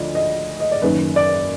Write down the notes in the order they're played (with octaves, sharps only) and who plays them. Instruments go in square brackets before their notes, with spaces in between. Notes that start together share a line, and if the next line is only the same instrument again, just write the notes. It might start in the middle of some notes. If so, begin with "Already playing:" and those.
Already playing: [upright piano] D2 F3 D5 D#5
D#5
D#5
D5
F#1 F#2 D#3 B4
D5